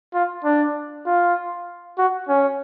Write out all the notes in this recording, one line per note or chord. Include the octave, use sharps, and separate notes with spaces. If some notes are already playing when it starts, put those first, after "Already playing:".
F4
D4
F4
F#4
C#4